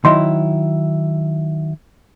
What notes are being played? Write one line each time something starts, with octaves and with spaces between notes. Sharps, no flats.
D#3 F#3 E4 D#5 C6